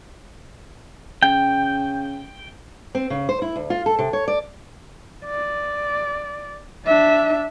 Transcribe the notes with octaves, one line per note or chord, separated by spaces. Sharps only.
C#3 G5
C4
C#3
C5
E4
D2
F4
A4
C3
C#5
D5
D5
D4 E5